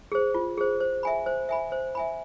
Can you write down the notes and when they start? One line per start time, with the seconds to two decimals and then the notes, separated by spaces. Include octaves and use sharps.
0.12 G#4 C5
0.34 F4
0.57 G#4 C5
0.80 C5
1.03 E5 G#5 B5
1.26 C5
1.49 E5 G#5 B5
1.72 C5
1.95 E5 G#5 B5